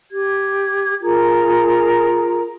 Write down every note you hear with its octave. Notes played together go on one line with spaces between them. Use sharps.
G4 G#6
F4 G#4 A#4 A#5